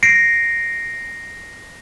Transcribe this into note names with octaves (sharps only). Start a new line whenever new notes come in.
A#6 C7 D7